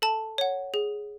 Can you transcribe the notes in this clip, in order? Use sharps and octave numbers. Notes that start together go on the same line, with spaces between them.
A4 A5
C#5 F#5
G#4